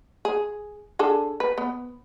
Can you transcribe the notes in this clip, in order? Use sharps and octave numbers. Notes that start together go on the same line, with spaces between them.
G#4
D4 G#4 A4
B4
B3